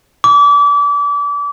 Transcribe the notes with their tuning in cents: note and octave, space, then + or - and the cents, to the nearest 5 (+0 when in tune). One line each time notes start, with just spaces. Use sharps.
D6 -30